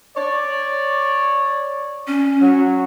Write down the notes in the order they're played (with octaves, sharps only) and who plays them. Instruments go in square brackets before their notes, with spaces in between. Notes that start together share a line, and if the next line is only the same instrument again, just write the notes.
[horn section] C#5 D5
[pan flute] C#4
[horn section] F#3